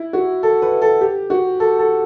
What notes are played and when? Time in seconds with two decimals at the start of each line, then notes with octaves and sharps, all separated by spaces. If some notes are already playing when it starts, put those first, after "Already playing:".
Already playing: E4
0.13 F#4
0.43 A4
0.62 B4
0.82 A4
1.01 G4
1.30 F#4
1.60 A4
1.79 A4